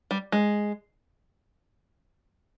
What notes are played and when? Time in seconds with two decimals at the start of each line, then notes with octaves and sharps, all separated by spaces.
0.11 G3
0.32 G#3